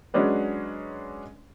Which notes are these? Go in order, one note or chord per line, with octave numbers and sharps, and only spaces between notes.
F#3 G#3 C#4 D4 B4